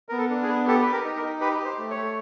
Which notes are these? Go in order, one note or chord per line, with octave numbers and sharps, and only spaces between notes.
B3 A#4
A4
D4
G#4
B3
G4 A4
G4 B4
A#4
D#4
A#4
D#4
G4 B4
G4
C5
A3
C#5
A3